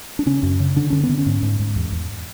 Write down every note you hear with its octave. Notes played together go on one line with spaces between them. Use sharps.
D4
C#3 C#4
F#2
C#3
D3 D4
D3 C#4
B3
D3
C#4
G#2
G#2
G#2
E2
E2